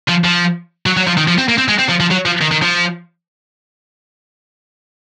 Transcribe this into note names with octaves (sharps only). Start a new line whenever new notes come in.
F3
F3
F#3
F#3
F3
D#3
F3
C4
A#3
C4
G#3
C4
F3
F3
F#3
F3
D#3
D#3
F3